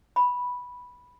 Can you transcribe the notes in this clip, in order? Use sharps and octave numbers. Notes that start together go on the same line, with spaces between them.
B5